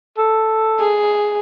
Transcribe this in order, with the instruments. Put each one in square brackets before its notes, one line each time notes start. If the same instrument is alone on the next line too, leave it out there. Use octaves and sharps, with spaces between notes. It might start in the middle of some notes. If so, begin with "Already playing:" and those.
[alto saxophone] A4
[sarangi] G#4